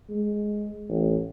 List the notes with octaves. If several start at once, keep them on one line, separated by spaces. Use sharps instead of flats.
G#3
A1